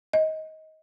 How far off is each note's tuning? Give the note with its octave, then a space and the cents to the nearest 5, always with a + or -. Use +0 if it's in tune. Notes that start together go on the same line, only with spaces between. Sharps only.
D#5 +20